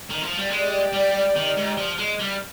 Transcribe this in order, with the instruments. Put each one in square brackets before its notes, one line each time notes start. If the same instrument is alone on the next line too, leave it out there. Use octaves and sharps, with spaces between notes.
[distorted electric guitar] D#3
F3
G3
[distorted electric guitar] G#3 [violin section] G4 D5 G5
[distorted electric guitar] G3
D#3
G#2
F3
G#3
G3